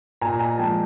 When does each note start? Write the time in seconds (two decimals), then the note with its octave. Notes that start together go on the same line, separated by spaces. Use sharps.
0.21 A#2 G#5 A#5
0.39 G#5 A#5
0.58 F3 G#3 G5 A5